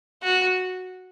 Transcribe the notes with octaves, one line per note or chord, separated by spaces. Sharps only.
F#4